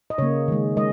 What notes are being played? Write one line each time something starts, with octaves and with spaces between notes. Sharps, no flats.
D#5
C#3 A#3 C#5
D#3 G#3
G#3 D#5